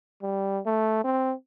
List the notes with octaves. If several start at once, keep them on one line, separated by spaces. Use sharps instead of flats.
G3
A3
C4